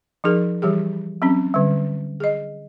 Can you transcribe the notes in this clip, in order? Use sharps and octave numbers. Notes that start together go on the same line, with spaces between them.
F3 D#4 G#4 A#4
E3 G3 G4 G#4
F#3 C4 C#4
D3 G3
G#4 D#5